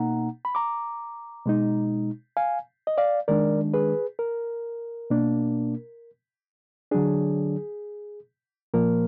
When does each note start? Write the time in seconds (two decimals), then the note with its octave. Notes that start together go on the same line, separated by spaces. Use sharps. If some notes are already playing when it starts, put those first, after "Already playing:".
Already playing: B2 A#3 D#4 F#5 A#5
0.45 B5
0.55 A#5 D6
1.46 B2 G#3 D#4
2.37 F5 G#5
2.87 D#5
2.98 D5 F5
3.28 D#3 G#3 D4 A#4 D5
3.74 G#4 B4
4.19 A#4
5.10 B2 A#3 D4
6.91 D3 F#3 D4 G#4
8.74 A#2 F3 A#3 A#4